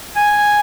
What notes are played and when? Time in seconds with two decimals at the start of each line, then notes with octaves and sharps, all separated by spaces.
0.16 G#5